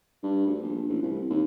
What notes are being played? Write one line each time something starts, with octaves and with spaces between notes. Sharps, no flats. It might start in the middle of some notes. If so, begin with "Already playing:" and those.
G2
D2
A#1
A1
C2
D#2